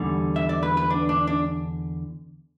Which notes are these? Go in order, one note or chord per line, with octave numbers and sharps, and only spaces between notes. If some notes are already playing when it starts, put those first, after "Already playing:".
Already playing: E2 D3 G3
E5
D5
B4
B4
D4
D4
D4